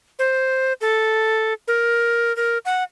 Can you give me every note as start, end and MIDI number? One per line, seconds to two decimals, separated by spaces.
0.19 0.73 72
0.81 1.53 69
1.68 2.35 70
2.37 2.58 70
2.65 2.84 78